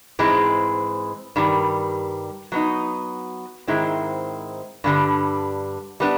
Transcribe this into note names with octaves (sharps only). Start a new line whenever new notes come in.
G#2 E3 G#3 C4
G2 D#3 G3
F#3 B3 D#4
G#2 D#3 G#3 C4 E4
G2 D3 G3
G3 B3 D4